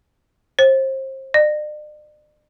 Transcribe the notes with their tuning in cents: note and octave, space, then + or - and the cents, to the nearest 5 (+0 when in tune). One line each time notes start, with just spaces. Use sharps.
C5 +30
D5 +45